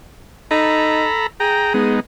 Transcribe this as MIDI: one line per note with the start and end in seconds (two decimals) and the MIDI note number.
0.51 1.06 63
0.51 1.27 69
0.51 1.27 82
0.51 1.27 83
1.40 1.94 68
1.40 1.73 79
1.40 1.73 82
1.74 2.00 56
1.74 2.00 59
1.74 2.00 63